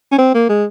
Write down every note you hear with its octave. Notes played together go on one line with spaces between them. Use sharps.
C#4
C4
A#3
G#3